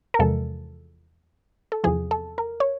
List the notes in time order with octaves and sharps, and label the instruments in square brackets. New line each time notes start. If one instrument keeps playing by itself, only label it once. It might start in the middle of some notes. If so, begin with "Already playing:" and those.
[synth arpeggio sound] A#4
E2 C3 F3 G#3 A4
A4
E2 C3 F3 G#4
A4
A#4
C#5